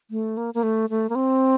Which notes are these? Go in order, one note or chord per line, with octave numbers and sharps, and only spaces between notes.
A3
A#3
A#3
A3
A3
A#3
C4